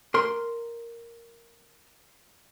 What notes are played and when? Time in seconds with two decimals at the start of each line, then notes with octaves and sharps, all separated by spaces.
0.14 A#4 C6